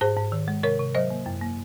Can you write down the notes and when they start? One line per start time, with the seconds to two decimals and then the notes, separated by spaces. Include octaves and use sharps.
0.01 G#2 G#4 C5
0.17 G#2
0.32 D#3
0.48 G#3
0.63 C3 A#4 C#5
0.79 C3
0.95 F#3 C5 D#5
1.10 A#3
1.26 F#2
1.41 A#3